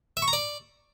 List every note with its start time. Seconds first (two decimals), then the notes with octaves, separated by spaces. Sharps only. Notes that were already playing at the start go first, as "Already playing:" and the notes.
0.17 E5
0.22 C#6
0.28 A#5
0.33 D5